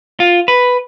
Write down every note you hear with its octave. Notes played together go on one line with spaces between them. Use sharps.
F4
B4